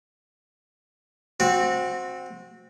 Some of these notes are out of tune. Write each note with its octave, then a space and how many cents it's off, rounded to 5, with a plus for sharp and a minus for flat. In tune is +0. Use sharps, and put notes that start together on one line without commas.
C4 +0 F#4 -25